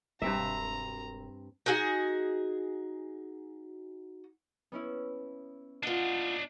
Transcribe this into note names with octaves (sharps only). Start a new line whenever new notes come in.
E1 G2 C4 E5 A#5
D#4 F#4 G#4 F#5
B3 C#4 E4
D4 F4 D#5 F#5